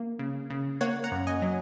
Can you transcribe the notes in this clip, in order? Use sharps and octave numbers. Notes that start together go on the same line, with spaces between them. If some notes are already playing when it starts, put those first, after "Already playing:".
Already playing: A#3
C#3
C#3
A#3 C#5 F#5
F#5 A#5
F#2
D#5 G#5
F#3